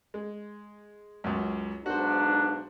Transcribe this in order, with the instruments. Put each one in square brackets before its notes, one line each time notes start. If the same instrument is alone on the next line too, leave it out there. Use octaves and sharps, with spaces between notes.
[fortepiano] G#3
C#2 F#2
[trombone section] B1 G#2 D4 [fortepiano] F#4 C5